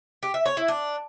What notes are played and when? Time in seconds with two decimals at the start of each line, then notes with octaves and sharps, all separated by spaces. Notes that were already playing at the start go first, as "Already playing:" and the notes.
0.23 G4
0.34 E5
0.45 C#5
0.57 E4
0.68 D4